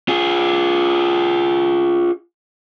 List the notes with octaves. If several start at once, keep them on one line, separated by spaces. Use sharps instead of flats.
F4 G#4